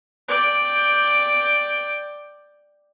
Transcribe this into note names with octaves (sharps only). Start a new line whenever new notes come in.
D5 G5